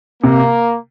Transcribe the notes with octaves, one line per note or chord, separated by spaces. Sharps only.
C3 A#3